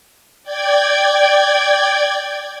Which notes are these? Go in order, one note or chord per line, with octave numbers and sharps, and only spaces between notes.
D5 G5 G#6